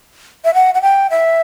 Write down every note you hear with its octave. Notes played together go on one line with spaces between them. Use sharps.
E5
F#5
F#5
G5
E5